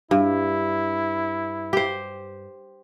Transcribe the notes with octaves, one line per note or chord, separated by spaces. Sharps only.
G2 E4
G4 C5